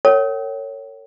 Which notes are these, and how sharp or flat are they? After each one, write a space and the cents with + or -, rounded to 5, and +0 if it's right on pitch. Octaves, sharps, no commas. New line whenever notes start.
A#4 -45 C#5 +0 G5 -45